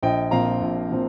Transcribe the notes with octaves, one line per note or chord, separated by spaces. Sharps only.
A#1 D#5 G5
A#2 F3 C4 F5 A#5
A#1
A#2 F3 C4